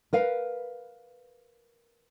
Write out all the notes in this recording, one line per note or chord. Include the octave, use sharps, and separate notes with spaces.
A#4 B4 F5